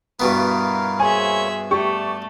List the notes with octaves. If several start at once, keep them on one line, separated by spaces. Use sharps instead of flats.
G2 B2 B3 E4 A#4 F5
A#3 G#4 C5 C#5 E5 G#5
A3 G4 D5 C#6